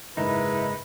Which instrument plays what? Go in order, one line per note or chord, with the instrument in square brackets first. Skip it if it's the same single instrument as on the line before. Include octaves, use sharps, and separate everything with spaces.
[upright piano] F#1 G#2 [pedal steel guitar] G#3 D#4 [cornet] E4 [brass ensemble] B4